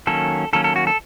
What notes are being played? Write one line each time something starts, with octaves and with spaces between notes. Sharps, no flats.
D#3 F#3 A#3 C#4 A4
D#3 F#3 A#3 C#4 A4
A4
F#4
A4